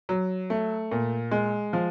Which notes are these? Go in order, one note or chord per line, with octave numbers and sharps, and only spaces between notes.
F#3
A3
A#2
G#3
F3